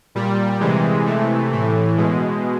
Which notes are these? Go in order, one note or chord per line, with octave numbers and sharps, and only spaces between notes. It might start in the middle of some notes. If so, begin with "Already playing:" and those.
A#2 G3
C3 E3 G#3
C3 E3 A3
A2 E3
B2 G#3